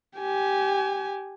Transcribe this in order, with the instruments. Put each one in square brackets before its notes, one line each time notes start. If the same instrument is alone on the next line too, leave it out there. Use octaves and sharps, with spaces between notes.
[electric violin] G4 G#5